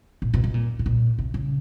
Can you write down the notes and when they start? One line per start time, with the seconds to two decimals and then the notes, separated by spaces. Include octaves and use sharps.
0.22 A#2
0.34 B2
0.44 B2
0.54 A#2
0.79 B2
0.86 A#2
1.18 C3
1.34 C#3